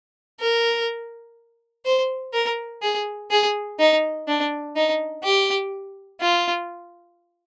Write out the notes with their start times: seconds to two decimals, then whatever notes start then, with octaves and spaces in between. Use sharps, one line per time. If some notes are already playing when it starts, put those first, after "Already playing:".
0.40 A#4
1.85 C5
2.33 A#4
2.82 G#4
3.31 G#4
3.79 D#4
4.28 D4
4.76 D#4
5.24 G4
6.21 F4